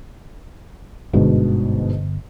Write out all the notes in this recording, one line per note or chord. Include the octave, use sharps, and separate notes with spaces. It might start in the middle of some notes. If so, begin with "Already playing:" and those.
G1 G#2 B2 D3